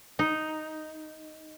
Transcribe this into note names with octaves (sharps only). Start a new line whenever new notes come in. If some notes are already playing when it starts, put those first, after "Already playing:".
D#4